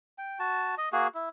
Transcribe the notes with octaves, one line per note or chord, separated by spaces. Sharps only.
G5
F#4 A5
D#5
A#3 F#4 G#4
E4